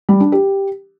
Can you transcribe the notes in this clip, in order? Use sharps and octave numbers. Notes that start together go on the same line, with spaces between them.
G3
D4
G4